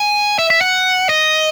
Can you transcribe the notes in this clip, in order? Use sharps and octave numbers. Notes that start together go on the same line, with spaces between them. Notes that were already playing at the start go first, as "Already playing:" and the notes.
Already playing: G#5
E5
E5
F#5
D#5